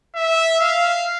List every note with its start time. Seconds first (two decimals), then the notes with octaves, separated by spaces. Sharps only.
0.16 E5
0.61 F5